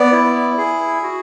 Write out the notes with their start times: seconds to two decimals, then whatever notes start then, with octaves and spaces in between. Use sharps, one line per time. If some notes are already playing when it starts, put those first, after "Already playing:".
Already playing: B3 D5
0.12 E4
0.58 G#4
1.03 F#4